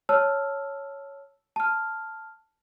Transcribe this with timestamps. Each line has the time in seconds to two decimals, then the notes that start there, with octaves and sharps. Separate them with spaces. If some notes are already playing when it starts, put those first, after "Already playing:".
0.09 C#5 A5 E6 F6
1.56 A5 F6